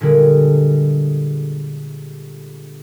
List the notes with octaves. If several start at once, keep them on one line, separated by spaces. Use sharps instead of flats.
A#2 D3 G3 G#3